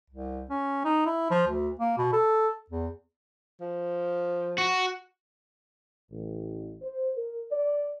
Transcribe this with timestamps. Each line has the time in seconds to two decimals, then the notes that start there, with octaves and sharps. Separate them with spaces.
0.10 C2
0.50 C#4
0.85 D#4
1.06 E4
1.31 F3
1.48 D2
1.79 A#3
1.98 B2
2.13 A4
2.70 E2
3.61 F3
4.58 F#4
6.11 A1
6.82 C5
7.17 A#4
7.51 D5